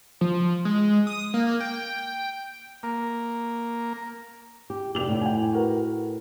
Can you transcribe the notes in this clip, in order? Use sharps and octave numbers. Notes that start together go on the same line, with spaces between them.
F3
G#3
D#6
A#3
G5
A#3
G4
F1 G4 F7 F#7
A2
G5 G#5
F#4 A#4 B4